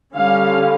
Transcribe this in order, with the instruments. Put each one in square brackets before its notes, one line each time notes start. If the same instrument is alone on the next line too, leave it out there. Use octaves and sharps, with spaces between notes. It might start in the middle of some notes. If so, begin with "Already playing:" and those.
[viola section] D3 G3 C#4 F5